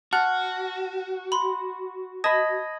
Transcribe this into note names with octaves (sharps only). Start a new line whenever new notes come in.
F#4 F#5 A5 F6 F#6
B5 C6
D#5 A5 B5 D#6 G#6 A#6